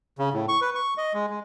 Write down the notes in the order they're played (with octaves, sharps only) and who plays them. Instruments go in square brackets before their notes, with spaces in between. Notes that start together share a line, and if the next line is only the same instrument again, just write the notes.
[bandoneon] C#3
A2
C#6
B4
C#6
D#5
G#3
G#3